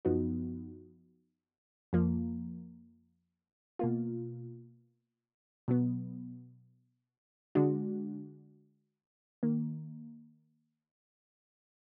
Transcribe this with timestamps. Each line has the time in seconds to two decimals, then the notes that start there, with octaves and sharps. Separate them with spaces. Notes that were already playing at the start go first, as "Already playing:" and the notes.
0.05 F#2 F3 B3 D#4 F#4
1.93 F2 F3 A#3
3.79 B2 A#3 F4
5.68 B2 F#3 B3
7.55 D3 G#3 D4 F#4
9.43 D#3 A#3